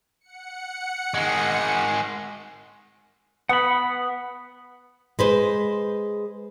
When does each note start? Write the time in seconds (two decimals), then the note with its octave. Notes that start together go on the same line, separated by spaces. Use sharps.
0.21 F#5 C#7
1.14 D#3 G#3
3.49 B3 F#5 B5
5.19 G#3 B4 C5